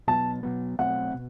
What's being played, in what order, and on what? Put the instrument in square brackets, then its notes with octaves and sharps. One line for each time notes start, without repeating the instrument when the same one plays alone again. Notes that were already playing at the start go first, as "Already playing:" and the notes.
[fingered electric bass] B2 F#3 B3 [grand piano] A5
[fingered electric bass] B2 F#3 B3
[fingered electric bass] B2 F#3 A3 C4 [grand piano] F#5
[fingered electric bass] B2